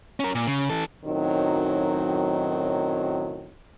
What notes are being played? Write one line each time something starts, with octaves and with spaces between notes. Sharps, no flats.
C#4 A#4
A#2
C#3
E3 A4
F#2 A2 D#3 F#3 C4 D#4